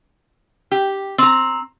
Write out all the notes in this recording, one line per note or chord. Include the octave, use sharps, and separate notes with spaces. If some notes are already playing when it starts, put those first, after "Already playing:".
G4
C4 A#5